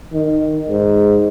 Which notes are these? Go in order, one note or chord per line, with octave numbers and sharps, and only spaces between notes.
D#3
G#2